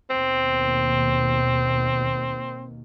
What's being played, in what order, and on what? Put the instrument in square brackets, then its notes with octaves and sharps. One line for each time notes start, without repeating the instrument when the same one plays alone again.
[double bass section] D#2 B2 [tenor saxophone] C4